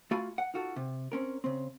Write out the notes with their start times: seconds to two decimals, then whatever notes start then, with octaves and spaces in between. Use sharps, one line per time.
0.11 A3 F4 F#4 F5 G#5 B5
0.38 F#5
0.54 D#4 F4 F#4 A4
0.76 C3
1.12 C4 C#4 A#4
1.44 C#3 C4